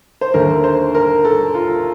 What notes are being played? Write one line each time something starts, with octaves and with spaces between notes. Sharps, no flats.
C5
D#2 D3 A3 A#4
C5
A#4
A4
F4